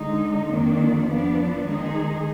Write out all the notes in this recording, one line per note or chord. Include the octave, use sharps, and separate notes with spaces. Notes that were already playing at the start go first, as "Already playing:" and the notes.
Already playing: D3 G#3 D#4
F2 D#3 A#3 D4
F3 B3 D4
D#3 G#3 D#4 G#4